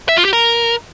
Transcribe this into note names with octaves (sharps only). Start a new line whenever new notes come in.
E5
F4
G4
A#4